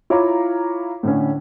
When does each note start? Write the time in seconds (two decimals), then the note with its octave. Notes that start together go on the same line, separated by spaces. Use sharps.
0.10 E4 F4 C#5 F5 A#5 D6
1.03 A2 D3 C#4